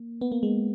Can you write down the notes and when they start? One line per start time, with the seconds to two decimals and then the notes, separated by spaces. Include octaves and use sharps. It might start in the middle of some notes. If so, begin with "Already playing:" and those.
Already playing: A#3
0.21 B3
0.32 A#3
0.43 G#3